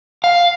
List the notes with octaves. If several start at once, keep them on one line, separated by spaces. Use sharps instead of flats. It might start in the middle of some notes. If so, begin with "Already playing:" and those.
F5